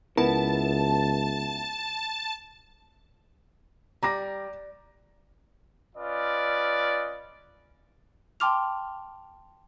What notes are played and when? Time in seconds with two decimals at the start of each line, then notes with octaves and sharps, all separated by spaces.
0.17 C#2 B3 E4 A#4 A5
4.03 G3 A#5 D6 A#6
5.96 C#4 F4 B4 D5 D#5
8.40 G5 A5 C6 D6 F6 F7